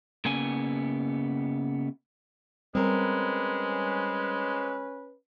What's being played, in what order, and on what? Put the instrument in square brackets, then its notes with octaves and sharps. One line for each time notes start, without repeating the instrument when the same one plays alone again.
[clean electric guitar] C#3 A#3 B3 G#5
[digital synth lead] G3 [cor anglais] G#3 [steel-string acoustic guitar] C4 A#4 [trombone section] C#4 B4